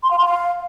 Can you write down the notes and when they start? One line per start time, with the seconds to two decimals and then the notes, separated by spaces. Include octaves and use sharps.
0.03 C6
0.11 F5
0.18 C6
0.26 F5